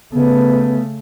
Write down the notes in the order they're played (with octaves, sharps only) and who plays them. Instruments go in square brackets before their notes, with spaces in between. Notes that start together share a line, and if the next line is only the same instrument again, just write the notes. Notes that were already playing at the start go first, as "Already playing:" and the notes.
[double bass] C#3 A3 [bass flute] B3